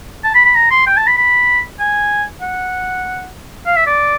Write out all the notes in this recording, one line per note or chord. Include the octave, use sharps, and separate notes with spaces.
A5
B5
B5
A#5
C6
G5
A5
B5
B5
G#5
F#5
F5
E5
D5